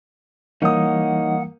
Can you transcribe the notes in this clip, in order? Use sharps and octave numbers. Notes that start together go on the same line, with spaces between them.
E3 G3 A#3 D#4 C#5 F#5 D#6